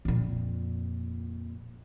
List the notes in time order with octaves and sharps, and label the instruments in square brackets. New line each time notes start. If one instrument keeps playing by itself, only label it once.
[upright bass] F2 A#2